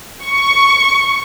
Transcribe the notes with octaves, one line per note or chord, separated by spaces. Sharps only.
C#6